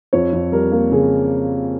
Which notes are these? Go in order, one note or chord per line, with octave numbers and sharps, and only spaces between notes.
F2 C#5
F2
G3 A#4
A#3
C#3 G#4